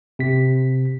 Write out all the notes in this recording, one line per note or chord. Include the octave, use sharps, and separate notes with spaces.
C3 B6